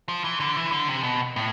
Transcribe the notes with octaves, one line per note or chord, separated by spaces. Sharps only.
F3
E3
D3
E3
D3
C3
B2
A2